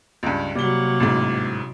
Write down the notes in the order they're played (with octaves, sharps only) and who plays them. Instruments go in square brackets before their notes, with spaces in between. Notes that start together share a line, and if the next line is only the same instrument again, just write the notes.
[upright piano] C#2 G2
[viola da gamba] C3 F#3 [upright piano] G3 G7 [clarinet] A#3
[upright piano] A1 G#2